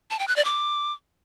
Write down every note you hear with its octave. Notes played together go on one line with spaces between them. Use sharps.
A5
G5
F#6
D5
D6